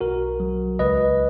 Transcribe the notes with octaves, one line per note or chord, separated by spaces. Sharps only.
B1 F#4 A#4
F#3
C#2 B4 D#5